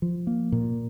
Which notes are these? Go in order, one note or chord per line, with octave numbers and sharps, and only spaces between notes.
F3
A#3
A#2